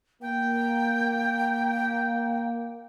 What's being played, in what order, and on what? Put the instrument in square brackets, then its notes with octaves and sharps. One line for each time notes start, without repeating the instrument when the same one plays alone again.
[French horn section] A#3 [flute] G5